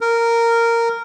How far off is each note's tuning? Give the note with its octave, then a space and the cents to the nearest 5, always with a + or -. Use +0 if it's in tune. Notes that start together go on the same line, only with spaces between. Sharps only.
A#4 -10